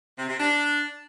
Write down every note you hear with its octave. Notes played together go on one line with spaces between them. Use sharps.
C3
C3
D4